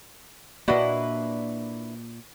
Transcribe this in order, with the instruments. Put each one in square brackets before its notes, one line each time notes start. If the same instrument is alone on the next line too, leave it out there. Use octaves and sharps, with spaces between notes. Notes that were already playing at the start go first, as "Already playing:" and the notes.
[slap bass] A#2 A#3 [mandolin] D4 E4 B4 [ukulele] F#4 D#5